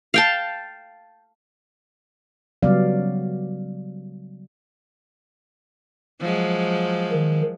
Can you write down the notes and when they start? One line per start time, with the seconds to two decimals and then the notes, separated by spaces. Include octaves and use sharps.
0.14 F5 G5 A5
2.63 C#3 F#3 G3 B3 D5 F5
6.20 F3 F#3 G#3
7.12 D#3